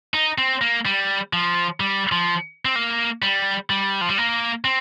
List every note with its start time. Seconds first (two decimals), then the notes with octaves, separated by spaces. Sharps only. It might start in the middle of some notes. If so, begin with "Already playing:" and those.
0.14 D#4
0.38 C4
0.61 A#3
0.86 G3
1.33 F3
1.80 G3
2.12 F3
2.65 C4
2.76 A#3
3.22 G3
3.70 G3
4.01 F3
4.09 G3
4.18 A#3
4.65 C4